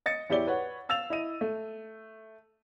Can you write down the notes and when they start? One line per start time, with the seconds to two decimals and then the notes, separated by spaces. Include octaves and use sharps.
0.06 D#5 A6 C#7
0.30 E2 E4 G4 C#5 D5 G7
0.47 B4 C#5 F#5
0.89 F5 E6 A6 E7 F7
1.10 E4 D#5 D#7
1.41 A3